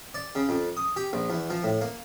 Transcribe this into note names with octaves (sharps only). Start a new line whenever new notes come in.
D5
C#3
F2
D#6
G4
A#1
E2
F3
A2
A#3